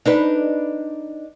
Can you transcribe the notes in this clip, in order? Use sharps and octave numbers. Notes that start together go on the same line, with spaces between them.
D4 D#4 B4